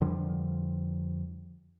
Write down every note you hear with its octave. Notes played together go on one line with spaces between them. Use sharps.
F2 D3 F3 G3